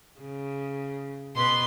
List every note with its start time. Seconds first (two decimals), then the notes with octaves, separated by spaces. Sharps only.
0.21 C#3
1.36 B2 B4 C6